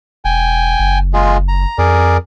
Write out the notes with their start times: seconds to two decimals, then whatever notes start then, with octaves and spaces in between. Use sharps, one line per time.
0.25 E1 G5 G#5
0.80 F#1
1.14 G#3 F4 G#4
1.48 A#5
1.78 F2 G#4 A#4 D5